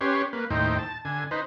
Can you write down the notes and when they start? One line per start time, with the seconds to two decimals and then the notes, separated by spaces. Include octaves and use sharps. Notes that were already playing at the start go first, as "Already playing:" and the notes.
0.01 C#4 G4 B4 C#5 C6
0.33 A#3 B4
0.50 D#2 A2 D#4 C5 G5
0.78 A5
1.05 D3 G#5
1.31 D#4 B4 C5